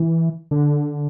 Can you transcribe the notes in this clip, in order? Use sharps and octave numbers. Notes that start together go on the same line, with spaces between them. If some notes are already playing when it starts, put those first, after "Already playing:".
Already playing: E3
D3